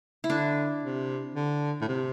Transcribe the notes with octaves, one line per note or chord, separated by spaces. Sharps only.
E4
D3 D4
C3
D3
A2
C3